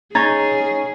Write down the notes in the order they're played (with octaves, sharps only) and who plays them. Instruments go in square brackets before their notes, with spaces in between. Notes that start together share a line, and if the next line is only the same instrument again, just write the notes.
[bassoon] C#4 [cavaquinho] D#4 C#5 [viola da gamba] G#4 [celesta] A#5 G#6 A6